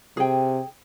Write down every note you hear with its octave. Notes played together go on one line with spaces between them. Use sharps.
C3 G#4 G5